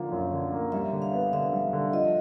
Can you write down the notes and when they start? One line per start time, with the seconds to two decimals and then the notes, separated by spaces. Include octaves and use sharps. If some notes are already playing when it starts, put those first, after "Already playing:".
Already playing: D3 F3 A#3 F5
0.12 F#2
0.32 D3
0.52 A#3
0.72 G3 E5
0.92 D3
1.02 F5
1.13 B3
1.33 D3 E5
1.53 G3
1.73 D3
1.93 F3 D#5